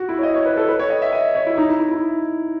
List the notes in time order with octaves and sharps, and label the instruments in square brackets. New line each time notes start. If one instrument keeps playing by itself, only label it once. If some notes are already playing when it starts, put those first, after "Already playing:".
Already playing: [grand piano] F#4
E4
C#5
D#5
C#5
B4
A4
B4
C#5
D#5
E5
D#5
C#5
E4
D#4
E4
E4
E4